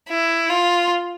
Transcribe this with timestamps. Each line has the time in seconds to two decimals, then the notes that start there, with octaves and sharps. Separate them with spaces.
0.09 E4
0.49 F4